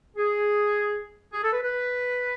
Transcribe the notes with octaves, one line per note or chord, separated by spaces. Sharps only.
G#4
G#4
A4
B4
B4